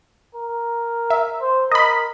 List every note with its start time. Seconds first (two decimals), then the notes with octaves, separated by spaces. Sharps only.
0.35 A#4
1.10 E5
1.42 C5
1.71 A#4 D#5 B5